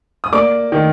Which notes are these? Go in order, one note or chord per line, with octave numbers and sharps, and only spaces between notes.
D#6
A#3 D5 D6
D#3